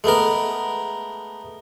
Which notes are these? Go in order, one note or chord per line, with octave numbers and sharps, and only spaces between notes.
G#3 A3 B3 A#4